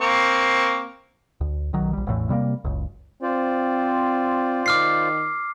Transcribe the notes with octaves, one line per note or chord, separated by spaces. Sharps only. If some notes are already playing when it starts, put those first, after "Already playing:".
A#3 C4 C#6
D2
B1 D#3 F#3
A#1 G3
A1 E2 A2 E3
C3 G3 G#3 A#3
F#1 C#2
C4 F4 C5 D5
D#3 D6 F6 C7